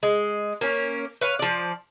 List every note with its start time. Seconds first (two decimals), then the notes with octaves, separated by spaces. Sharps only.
0.03 G#3
0.61 A#3 C#4
1.21 B4 C#5 F5
1.39 F3 D5